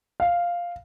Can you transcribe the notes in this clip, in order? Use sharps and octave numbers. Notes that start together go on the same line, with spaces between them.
F5